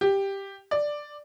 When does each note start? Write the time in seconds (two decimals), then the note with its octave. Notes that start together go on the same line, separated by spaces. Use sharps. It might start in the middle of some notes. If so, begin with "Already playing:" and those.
0.01 G4
0.71 D5